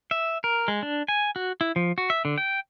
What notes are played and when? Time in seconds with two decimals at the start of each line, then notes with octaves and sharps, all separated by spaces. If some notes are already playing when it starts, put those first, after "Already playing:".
0.11 E5
0.44 A#4
0.68 G#3
0.83 D4
1.08 G#5
1.36 F#4
1.61 E4
1.76 F3
1.98 F#4
2.10 E5
2.25 D3
2.38 G5